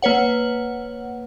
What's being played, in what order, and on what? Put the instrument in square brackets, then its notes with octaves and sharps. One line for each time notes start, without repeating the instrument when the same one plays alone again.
[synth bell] A#3 B4 C#5 F#5